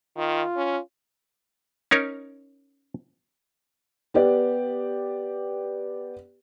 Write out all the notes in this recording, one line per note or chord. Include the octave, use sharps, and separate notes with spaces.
D#3 F4
C#4
C#4 D#4 A#4 C#5
B3 G4 D5